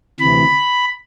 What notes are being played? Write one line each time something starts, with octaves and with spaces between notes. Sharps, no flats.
D2 C3 E3 B5